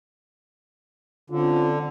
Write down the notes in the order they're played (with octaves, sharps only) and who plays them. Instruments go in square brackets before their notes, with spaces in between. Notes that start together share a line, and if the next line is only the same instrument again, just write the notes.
[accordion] D3 [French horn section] C4 C#4 F4